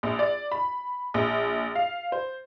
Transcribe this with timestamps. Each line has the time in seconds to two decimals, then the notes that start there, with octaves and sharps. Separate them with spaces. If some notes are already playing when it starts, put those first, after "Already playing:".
0.03 A#1
0.19 D5
0.52 B5
1.14 A#1
1.75 F5
2.12 C5